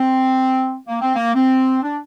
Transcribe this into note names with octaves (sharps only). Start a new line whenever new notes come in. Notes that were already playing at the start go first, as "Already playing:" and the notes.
Already playing: C4
A#3
C4
A#3
C4
D4